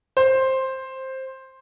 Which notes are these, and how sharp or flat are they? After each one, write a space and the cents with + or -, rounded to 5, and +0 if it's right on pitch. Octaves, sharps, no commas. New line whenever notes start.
C5 +10